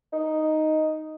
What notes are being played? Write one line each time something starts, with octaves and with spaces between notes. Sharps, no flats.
D#4